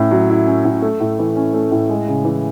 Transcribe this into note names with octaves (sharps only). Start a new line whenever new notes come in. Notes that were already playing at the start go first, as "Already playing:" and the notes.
Already playing: A2 C#4
F#3
E4
C#4
A2
A3
A2
E3
C#4
A3
A2
G#3
C#3
E3